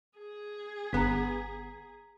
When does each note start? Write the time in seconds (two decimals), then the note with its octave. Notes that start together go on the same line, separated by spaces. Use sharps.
0.18 G#4
0.93 G1 B3 A#5 B6